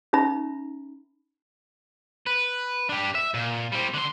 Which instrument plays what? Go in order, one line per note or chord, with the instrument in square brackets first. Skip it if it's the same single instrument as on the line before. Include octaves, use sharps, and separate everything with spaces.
[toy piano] C#4 D#4 E5 A#5 B5
[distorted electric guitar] B4
D4 G4
E5
A#2
G3 C4
D3 C6